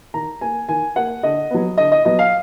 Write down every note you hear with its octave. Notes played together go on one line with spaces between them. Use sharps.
D#3 A#5
A#3 G#5
D#3 G#5
A#3 F#5
D3 D#5
F#3 B3
D3 D#5
D#5
F#3 B3 D#5
F5